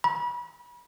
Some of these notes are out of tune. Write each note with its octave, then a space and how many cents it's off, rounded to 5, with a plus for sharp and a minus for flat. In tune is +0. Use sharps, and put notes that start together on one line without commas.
B5 -35